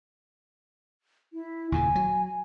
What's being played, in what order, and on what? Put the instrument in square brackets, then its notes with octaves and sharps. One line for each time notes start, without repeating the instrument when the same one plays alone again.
[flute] E4
[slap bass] D#2 A#2 C#3 [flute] G#5
[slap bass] F#3